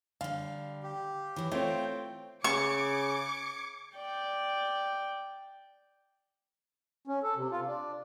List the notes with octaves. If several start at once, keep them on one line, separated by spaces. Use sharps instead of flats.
D3 G3 F5
G4
E3 F#3
A3 C4 F4 C#5 G5
C#3 C#6 D6 G#6 C#7
D5 G5
C#4
A4
C3
F4
D4